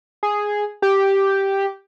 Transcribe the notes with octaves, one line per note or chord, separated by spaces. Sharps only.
G#4
G4